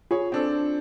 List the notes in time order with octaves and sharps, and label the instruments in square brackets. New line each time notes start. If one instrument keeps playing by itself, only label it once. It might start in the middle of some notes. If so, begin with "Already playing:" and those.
[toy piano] F4 [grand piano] G#4 C#5
[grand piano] C4 D4 A4